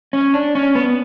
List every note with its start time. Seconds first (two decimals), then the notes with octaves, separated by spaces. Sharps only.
0.13 C#4
0.34 D4
0.55 C#4
0.75 B3